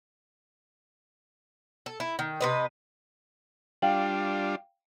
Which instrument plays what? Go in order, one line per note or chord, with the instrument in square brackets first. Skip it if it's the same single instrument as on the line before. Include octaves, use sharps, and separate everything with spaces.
[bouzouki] A4
E4
D#3
C3 B4 D#5
[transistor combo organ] G3 D4 F4 [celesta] F5 G5 F#7